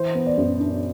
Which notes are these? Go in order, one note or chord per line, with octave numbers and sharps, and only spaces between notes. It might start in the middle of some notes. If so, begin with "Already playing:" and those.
Already playing: E3 C5
B3
D5
F#2
D4